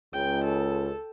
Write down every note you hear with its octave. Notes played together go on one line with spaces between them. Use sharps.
C#2 G5
A4